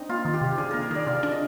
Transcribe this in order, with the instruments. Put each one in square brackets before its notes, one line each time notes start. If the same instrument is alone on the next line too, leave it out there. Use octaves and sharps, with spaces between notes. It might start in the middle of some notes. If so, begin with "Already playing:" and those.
Already playing: [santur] C4 D#4 [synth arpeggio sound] D4
[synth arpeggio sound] A#3 [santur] F4
[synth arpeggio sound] D#3
[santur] G4
[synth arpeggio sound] C3
[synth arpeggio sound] D4 [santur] G#4
[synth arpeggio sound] A#3 [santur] A#4
[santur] A#4
[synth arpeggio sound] D#3 [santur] D5
[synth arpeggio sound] C3 [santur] F5
[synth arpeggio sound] D4
[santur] D#5